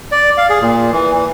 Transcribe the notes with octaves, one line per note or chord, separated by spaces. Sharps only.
D5
F5
G#4
A#2
E3
E3